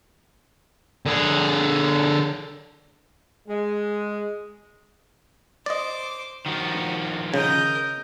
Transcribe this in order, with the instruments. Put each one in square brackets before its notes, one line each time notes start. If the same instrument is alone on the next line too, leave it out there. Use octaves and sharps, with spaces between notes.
[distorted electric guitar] D3 G#4
[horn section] G#3
[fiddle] C5 D6 [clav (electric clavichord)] D5 D#5
[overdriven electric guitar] D#3 F3 [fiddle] F#4
[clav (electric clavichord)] C#3 [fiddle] A#4 D#5 [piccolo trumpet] G6